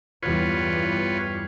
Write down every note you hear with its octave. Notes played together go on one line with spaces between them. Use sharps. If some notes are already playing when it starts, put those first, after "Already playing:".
E2 G2 G3 F4 B4 C#5